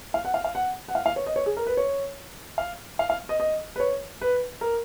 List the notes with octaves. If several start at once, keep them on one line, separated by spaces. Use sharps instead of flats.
F5
F#5
F5
F5
F#5
F#5
F5
F5
C#5
D#5
C#5
G#4
A#4
B4
C#5
F5
F5
F5
D#5
D#5
B4
C#5
B4
A#4